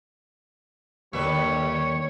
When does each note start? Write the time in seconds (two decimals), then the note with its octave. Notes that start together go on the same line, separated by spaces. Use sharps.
1.13 D#2 D3 G3 B4 C#5 E5